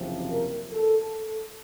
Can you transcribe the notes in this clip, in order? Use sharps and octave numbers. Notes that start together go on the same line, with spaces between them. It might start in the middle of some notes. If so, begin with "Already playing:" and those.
Already playing: F#1 E2 C3 F3
A#4
A4